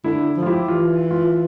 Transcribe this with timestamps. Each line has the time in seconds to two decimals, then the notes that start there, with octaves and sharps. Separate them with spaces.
0.04 D3 E4
0.36 F3
0.43 F4
0.46 E4 G4
0.68 E3 F4
1.11 F4